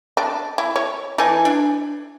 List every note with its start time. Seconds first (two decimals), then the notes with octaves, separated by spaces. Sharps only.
0.17 D4
0.58 E4
0.76 C#5
1.18 E3 D#4 A4 G#5
1.45 D4